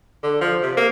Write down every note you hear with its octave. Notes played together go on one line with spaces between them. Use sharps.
D3
F3
C3
A#3